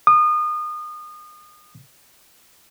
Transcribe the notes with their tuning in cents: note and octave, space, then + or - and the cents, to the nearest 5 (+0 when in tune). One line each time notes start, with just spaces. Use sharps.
D#6 -30